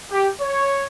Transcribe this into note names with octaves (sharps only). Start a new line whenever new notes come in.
G4
C#5